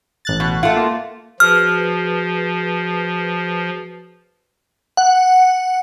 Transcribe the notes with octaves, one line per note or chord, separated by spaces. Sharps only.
A1 F#6 A6
B2
A3 F4 F#5
A#3
F3 F#4 G#4 B4 F6
F#5